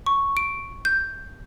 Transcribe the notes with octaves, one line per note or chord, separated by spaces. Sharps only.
C#6
D7
G6